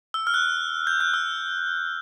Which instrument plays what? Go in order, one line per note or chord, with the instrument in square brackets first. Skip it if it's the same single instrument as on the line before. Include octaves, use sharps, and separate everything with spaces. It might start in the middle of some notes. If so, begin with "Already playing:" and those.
[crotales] E6
F6
F#6
G6
F#6
E6